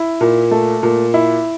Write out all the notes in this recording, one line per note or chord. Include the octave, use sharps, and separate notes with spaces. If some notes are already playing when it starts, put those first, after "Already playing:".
Already playing: E4
A#2
A3
A#2
E4